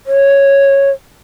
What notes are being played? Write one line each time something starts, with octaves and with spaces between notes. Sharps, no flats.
C#5